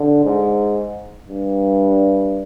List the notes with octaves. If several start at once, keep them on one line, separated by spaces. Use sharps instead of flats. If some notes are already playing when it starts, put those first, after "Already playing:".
Already playing: D3
G#2
G2